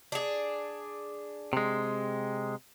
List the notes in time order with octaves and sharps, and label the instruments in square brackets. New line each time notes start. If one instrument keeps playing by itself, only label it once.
[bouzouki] D4 G#4
[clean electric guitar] C3 G#3